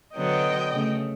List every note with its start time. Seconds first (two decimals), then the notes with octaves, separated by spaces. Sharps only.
0.16 D3 F#3 B3 D#5 G5
0.71 C#3 A3